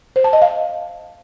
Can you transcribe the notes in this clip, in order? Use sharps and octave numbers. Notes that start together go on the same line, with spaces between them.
C5
A5
D#5
F5